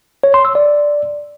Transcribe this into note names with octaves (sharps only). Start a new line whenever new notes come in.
C#5
C6
E6
D5